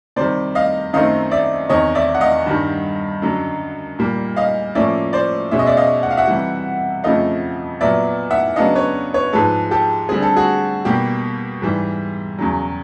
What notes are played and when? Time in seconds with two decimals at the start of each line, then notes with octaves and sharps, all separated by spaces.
0.16 C3 D#3 G3 C5 D5
0.55 D#5 F5
0.93 F#2 D#3 F#3 A3 C4 D#5 F5
1.31 D5 E5
1.69 E2 C3 D#3 C#5 D#5
1.95 D5 E5
2.15 F#5
2.20 D#5 F5
2.46 G2 D#3 G3
3.22 F#2 D3 F#3
3.99 A#2 G3 A#3
4.36 D#5 F5
4.75 A2 F3 A#3 C#4 D5 E5
5.13 C5 D5
5.51 B2 G#3 C#4 E5
5.59 D#5
5.66 D5 E5
5.77 D#5 F5
6.03 F#5
6.11 F5
6.17 E5 F#5
6.28 C3 E3 G3
7.04 F2 C#3 F3 A3 D#5 F5
7.81 A#2 F#3 B3 D5 E5
8.31 E5 F#5
8.56 C#3 F#3 B3 D4 D#5 F5
8.75 B4 C#5
9.14 B4 C#5
9.33 G#2 F3 G#3 A4 B4
9.71 G4 A4
10.09 D3 G3 C4 G#4
10.22 A4
10.36 F#4 G#4
10.85 B2 G3 A#3 G4
11.62 G#2 E3 G3
12.38 E2 C#3 F#3